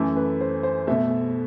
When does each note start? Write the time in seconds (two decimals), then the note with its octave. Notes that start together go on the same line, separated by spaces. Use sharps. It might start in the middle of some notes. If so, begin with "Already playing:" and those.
Already playing: F#2 E3 A3 A4
0.17 B4
0.41 C5
0.63 C5
0.87 B2 A3 E5